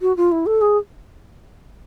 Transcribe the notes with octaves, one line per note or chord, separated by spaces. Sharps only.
F#4
F4
E4
A4
G#4